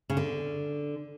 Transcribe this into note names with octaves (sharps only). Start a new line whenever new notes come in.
C#3
D3